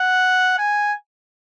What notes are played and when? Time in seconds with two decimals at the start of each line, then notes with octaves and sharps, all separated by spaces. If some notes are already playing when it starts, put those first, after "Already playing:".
Already playing: F#5
0.58 G#5